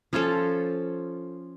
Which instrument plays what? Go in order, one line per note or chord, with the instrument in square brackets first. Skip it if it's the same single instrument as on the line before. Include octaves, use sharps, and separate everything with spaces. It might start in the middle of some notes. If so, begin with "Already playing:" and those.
[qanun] F3 C#4 F4 A4